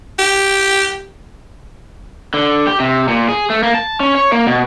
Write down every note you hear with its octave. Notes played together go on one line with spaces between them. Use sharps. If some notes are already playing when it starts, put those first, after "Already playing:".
G4
D3
G4
C3
A#2
G#4
A3
A#3
A5
C#4
C#5
A#3
B2